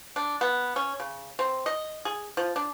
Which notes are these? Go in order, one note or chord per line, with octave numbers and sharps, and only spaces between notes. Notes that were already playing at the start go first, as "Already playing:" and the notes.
D4
B3
C#4
C#3
C4
D#5
G#4
F3
D4